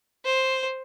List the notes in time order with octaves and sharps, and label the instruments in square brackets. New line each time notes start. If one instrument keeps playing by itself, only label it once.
[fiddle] C5